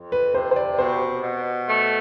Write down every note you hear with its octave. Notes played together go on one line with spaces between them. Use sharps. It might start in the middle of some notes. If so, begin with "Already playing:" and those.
Already playing: F2
B4
C3 C5
C5
D5
B2 C5
B2
A3